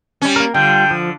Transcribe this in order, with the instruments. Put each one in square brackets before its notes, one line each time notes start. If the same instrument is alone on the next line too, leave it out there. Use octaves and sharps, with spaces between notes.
[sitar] G3 C#4
[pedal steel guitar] A#3 A#4
[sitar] D3 [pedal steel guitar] G3 F4 [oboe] G5
[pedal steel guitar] F3